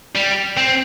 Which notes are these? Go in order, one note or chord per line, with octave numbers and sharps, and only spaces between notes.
G3
C4